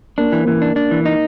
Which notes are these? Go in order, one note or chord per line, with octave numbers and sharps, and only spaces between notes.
A#3 D4
E3
E3 A#3
D4
D4
E3
D#4